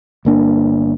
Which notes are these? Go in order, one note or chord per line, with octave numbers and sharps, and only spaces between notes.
G1 A#3 D4